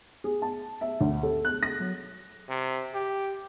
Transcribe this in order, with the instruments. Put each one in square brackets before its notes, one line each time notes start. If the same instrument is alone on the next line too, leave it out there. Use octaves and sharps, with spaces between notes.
[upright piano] G#4
A5
E5
D2
A4
F#6
A#6
F#3
[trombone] C3
G4